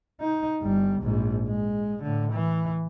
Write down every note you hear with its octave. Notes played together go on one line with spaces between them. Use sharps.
D#4
G1 G3
A#1 G#2
G#3
A2 D3
E3